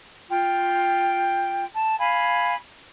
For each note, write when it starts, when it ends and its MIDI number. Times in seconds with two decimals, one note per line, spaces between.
0.30 1.64 65
0.30 1.64 79
1.74 1.95 81
1.99 2.54 77
1.99 2.54 80
1.99 2.54 83